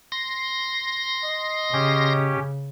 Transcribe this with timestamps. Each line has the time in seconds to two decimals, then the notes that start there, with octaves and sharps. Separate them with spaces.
0.12 C6 A#6
1.24 D#5
1.73 C#3 C#4 G4